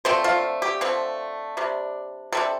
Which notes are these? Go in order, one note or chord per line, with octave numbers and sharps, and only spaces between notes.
D3 F3 A3 C4 C5
F4
G4
D3 F3 A3 C4
C3 G3 D4
C3 G3 D4 A4